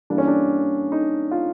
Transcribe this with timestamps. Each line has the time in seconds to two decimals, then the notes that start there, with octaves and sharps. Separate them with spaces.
0.10 G2 E3 G3 A#3 D4
0.18 C#4
0.28 D4
0.92 D#4
1.31 F4